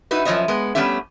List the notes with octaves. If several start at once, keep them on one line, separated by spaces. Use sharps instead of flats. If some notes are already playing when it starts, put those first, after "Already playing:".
D#4 E4 F#4 B4
F#2 F3 G#3 C#5 D#5 E5
G#3 B3
G3 A3 B3 C#4 G4 E5